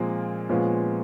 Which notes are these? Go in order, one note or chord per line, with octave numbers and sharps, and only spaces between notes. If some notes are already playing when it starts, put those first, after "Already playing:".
Already playing: A#2 F3 G#3 A#3 C4
A#2 F3 G#3 B3 C#4